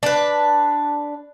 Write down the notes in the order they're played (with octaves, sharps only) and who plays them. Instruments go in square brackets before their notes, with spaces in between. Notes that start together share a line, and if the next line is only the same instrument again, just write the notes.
[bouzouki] D4 B4